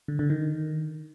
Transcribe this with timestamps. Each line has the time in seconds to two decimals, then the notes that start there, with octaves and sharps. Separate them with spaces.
0.08 D3
0.19 D3
0.30 D#3